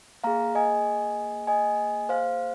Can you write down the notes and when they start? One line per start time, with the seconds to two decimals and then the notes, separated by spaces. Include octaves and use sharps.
0.24 A#3 G#4 F5 A#5
0.55 D#5 G#5
1.47 D#5 G#5
2.09 C5 F5